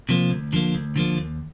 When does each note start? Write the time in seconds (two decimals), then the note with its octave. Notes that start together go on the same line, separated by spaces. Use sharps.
0.09 C3 F3 A#3
0.30 D2
0.53 D3 F3 A#3
0.75 D2
0.96 D3 F3 A#3
1.17 D#2